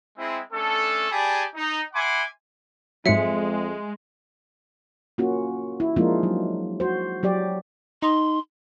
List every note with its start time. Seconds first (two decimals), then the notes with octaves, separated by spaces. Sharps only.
0.18 G#3 C4 E4
0.53 A3 C#4 D4 A4
1.11 G4 G#4 D5 G#5 A5 B5
1.56 D#4
1.94 E5 F#5 G#5 B5 C6 D6
3.06 F2 G#2 F#3 G#3 E5 C#7
5.18 A#3 C#4 F4 F#4
5.80 E4
5.96 F3 G#3 A#3 D4 D#4 F4
6.23 F#3
6.80 F#4 C5
7.23 F#3 G4 D5
8.02 D#4 C6